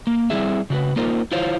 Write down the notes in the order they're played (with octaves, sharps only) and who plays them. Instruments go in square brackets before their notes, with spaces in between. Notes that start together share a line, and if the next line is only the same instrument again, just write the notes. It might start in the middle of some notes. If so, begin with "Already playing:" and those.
[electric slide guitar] A#3
G3 C4 E4 G#4 E5
C#3 F#4 G4 B4
A#3 D#4 F4 A#4 C5
E4 F4 C5 C#5 F5